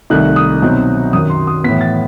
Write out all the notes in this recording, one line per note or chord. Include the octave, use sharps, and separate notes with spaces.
C2 C3 D#3 A3 D#4 F#6
D#6
B2 F#3 C4 D#4
F#2 D#3 F#3 D#6
C6
D#6
A2 E3 B3 B6
A6